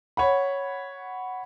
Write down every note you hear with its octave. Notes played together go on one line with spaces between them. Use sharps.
C#5 F#5 B5